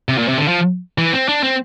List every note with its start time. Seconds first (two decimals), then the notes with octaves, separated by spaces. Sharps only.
0.09 C3
0.18 A#2
0.29 C3
0.38 D3
0.48 F3
0.98 E3
1.13 C4
1.28 D4
1.43 C4